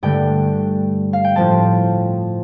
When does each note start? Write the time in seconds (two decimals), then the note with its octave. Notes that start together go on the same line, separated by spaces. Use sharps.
0.03 G2 D3 A3 D4 G5
1.13 F5
1.24 G5
1.36 A2 F3 C4 A5